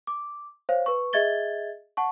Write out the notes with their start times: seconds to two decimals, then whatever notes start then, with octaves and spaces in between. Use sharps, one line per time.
0.07 D6
0.69 C5 C#5 F5
0.86 B4 C#6
1.13 G#4 D#5 E5 G#6 A6 G7
1.97 F#5 A5 C#6